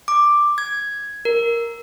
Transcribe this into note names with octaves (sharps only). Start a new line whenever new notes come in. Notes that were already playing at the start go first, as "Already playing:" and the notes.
D6
G#6
A#4